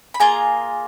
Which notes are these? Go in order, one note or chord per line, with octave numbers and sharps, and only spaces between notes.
B5
A#3 F4 G#4 A#5